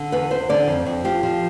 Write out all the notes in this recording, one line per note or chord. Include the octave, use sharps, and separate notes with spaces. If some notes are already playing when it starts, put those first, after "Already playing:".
Already playing: D3
E2 B4
E2 C5
D3 D5
F2
F2
F3 G4
F3